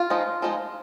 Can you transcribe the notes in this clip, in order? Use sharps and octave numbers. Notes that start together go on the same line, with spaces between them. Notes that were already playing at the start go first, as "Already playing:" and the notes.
Already playing: F4
F3 G#3 D#4
F3 G#3 D#4